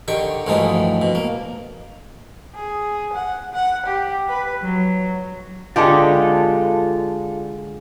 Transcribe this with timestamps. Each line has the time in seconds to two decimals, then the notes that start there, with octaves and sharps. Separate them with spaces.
0.08 D3 D#3 G4 C#6
0.47 D2 G2 D3 E3 F3 D#4
1.02 B2
1.15 A#3
2.53 G#4
3.11 F#5
3.52 F#5
3.85 G4
4.28 B4
4.61 F#3
5.76 D3 G#3 F4 G4 A4